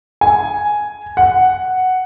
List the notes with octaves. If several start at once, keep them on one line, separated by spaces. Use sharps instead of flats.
G#5
F#5